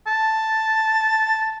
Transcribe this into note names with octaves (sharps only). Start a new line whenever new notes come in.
A5